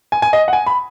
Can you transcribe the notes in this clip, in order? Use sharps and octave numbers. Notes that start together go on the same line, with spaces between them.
G#5
G#5
D#5
F#5
G#5
B5